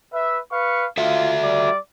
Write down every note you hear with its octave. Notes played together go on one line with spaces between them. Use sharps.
B4 E5
B4 F5 C#6
F4 F#4 A4 E5
G3 D5